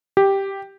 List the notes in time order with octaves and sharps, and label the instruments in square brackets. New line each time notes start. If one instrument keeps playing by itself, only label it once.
[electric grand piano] G4